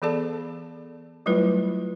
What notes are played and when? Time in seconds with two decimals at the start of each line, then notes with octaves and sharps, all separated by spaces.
0.02 E3 B3 G#4 A4 D5 A5
1.26 F#3 G3 A3 E4 F4 B4